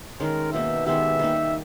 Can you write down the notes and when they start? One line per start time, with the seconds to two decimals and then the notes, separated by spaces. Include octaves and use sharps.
0.20 D#3 G#3 C#4 A#4
0.53 B2 A#3 D#4 E5
0.86 D#3 G#3 B3 G4 E5
1.19 D#3 G3 A#3 D#4